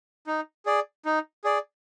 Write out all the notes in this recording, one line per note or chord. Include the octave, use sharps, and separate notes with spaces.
D#4
G#4 D5
D#4
G#4 D5